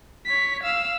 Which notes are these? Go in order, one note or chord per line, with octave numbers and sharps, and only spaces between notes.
C#5 B6
F5 E6